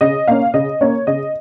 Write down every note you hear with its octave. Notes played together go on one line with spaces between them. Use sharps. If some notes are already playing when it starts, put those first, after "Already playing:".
C#3 D#5
A#3 C#4 F5
C#3 D#5
A#3 C#4 C#5
C#3 D#5